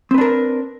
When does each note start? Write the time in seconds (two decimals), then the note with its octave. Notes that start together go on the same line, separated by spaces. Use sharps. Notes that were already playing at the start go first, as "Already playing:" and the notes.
0.11 C4
0.14 B4
0.18 D4
0.21 A#4